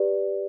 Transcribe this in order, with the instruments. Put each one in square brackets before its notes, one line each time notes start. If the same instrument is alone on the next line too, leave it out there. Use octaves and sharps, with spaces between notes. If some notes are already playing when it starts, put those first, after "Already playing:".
Already playing: [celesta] G4 B4 D5